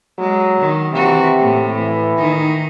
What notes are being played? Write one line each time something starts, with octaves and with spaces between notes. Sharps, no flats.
F#3 G#3
D#3
C3 E3 F#4
A2
E3
D#3 D#4